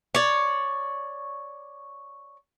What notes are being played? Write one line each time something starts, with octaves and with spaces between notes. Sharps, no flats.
C#5 D5